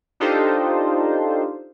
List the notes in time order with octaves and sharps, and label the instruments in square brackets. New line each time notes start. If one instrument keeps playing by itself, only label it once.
[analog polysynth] D4 D#4 F4 G4 A4 C5